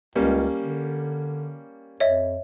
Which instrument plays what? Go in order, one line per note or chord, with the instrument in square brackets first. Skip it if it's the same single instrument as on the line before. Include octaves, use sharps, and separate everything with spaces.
[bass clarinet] C#2 [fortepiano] G3 A#3 C#4
[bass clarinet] D3
[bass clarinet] F2 [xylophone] C#5 D#5 E5